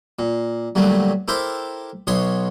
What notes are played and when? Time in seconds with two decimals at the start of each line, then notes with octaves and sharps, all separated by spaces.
0.19 A#2
0.75 G2 A#2 D3 F#3 G3 A3
1.28 E4 G4 A4 A#4 C5 E5
2.07 B1 B2 C#5 D#5 C6